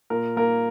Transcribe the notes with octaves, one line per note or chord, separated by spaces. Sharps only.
A#2 A#4
A#3 A#4